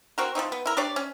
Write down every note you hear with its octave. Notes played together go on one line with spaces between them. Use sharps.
C4 F#4 A#4
F3 F#3 C4 D#4
B3
E4 A#4
D4 G4 C#5 D5
C#4